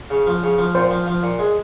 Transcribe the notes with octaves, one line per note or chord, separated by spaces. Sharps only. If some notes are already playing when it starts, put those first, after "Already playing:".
C#3
F3
C#3
F3
A#2 C5
F3
F3
A#2
G#3